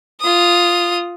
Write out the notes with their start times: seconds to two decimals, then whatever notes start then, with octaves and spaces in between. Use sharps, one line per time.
0.20 F4 D#6